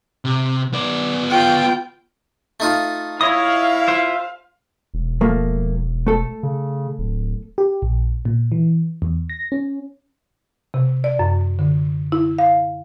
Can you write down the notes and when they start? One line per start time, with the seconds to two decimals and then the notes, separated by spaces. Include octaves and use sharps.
0.25 C3
0.73 B3 D5
1.30 F4 G5
2.60 A3 D#4 F4
3.21 E4 C#5 D#5 F5 D#6
3.88 F4 C5 E5
4.94 E1
5.21 F3 A3 A#3
6.07 A3 A4
6.43 C#3
6.98 D1
7.58 G4
7.82 A#1
8.25 A#2
8.52 E3
9.02 E2
9.30 A#6
9.52 C#4
10.74 C3
11.04 D5
11.19 F#2
11.59 D3
12.12 E4
12.39 F5